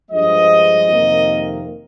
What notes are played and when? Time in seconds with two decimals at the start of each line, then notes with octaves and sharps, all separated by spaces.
0.10 G2 F3 G#3 D#5
0.87 F2 C3 D#3 A#3